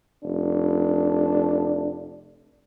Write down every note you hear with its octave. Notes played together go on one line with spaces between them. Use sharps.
F1 D4